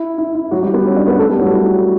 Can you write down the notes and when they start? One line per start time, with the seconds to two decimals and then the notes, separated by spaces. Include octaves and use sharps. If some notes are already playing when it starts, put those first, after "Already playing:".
Already playing: E4
0.18 E4
0.35 E4
0.51 F#3 F#4
0.63 G3 G4
0.73 B3 B4
0.85 C#4 C#5
0.96 D4 D5
1.07 B3 B4
1.19 A3 A4
1.30 G3 G4
1.41 F#3 F#4
1.52 E4